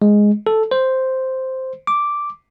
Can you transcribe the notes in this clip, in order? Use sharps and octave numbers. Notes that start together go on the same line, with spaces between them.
G#3
A4
C5
D6